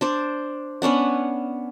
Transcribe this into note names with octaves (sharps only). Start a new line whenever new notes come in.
D4 C5 D5
B3 C#4 D4 F#5